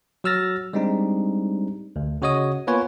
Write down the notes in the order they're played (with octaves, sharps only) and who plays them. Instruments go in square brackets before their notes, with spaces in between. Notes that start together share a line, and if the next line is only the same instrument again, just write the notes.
[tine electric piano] F#3 F#4 E6 F6 A6 A#6
G3 G#3 C4 D4 D#4
D2
C#3 F#4 C#5 D#5 D#6
A#3 B3 F4 B4 C#5 G#5